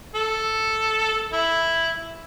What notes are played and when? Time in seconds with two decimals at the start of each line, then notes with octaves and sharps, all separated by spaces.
0.15 A4
1.32 E4